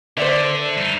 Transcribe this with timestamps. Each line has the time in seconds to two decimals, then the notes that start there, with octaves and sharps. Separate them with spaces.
0.17 D3 C5 D5 E5
0.77 G2 D#4